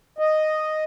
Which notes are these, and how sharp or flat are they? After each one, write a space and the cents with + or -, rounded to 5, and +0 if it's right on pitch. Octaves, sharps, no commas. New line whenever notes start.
D#5 -5